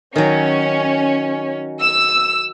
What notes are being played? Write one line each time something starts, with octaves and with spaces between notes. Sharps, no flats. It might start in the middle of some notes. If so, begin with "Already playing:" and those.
D#3 F#3 C#4
E6